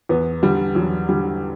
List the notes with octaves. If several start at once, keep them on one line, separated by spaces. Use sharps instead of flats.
E2 B3
D3 G3
E2 F#3
D3 G3